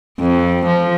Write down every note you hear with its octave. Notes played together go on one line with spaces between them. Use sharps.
F2
F3